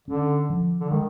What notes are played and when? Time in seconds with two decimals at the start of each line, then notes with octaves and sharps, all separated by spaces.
0.08 D3 C#4
0.50 F3
0.81 D3
0.90 D#3 G#3